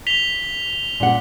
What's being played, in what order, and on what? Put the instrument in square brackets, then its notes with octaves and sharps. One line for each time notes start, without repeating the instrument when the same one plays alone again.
[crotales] B6 F7 G7
[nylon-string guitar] A#2 C#4 F#5